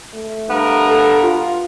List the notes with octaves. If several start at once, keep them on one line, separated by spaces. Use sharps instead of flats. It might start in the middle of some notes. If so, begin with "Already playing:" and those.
A3
G2 B3 A#4
A4
F4